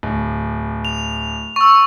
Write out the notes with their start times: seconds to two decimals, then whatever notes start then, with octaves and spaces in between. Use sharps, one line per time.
0.03 D1
0.85 F7
1.56 C#6 E6